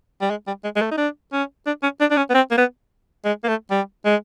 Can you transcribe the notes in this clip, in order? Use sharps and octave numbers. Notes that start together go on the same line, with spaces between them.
G3
G#3
G3
G#3
G#3
A3
D#4
D4
C#4
D4
C#4
D4
D4
C#4
B3
C4
A#3
B3
G#3
A#3
A3
G3
G#3